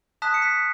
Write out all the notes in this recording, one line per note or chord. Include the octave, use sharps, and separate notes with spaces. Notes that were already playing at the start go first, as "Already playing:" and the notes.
A5 D#6 F#6 B6
C#7
B6